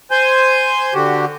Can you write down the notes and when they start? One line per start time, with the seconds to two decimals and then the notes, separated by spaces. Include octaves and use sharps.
0.11 C5 G#5 G6
0.94 D3 F#4 G4